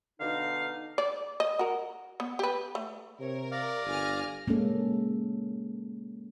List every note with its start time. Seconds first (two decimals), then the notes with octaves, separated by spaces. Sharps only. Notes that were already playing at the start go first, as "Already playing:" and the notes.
0.20 B2 D3 D#4 F5
0.98 D5
1.40 D#5
1.59 F#4 A#4
2.20 B3
2.39 G4 B4
2.75 A3
3.20 C3 A#4 C#5
3.51 D5 F5 A#6
3.85 G1 G#5 F6
4.48 G#3 A#3 C#4 A4